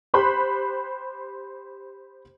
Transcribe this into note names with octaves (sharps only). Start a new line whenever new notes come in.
G4 C5 B5 C6 F#6